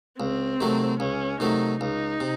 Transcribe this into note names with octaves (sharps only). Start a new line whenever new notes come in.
C#2 C4
C3 D#3 F#3 A3
C#2 C#4
C3 D#3 F#3 A3 D#4
C#2 D#4
C3